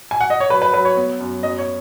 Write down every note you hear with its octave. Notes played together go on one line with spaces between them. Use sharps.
G#5
F#5
D#5
C#5
F#3 B4
B4
F#3 B4
C#5
B3
F#2
F#2 D#5
C#5